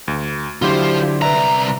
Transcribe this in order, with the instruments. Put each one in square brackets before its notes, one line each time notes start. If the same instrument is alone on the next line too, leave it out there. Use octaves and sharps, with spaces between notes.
[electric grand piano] D2
[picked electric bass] D3 [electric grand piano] F#3 E4 G4 [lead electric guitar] F4 C5
[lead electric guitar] C2 A#5 [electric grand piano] B4 D5 E5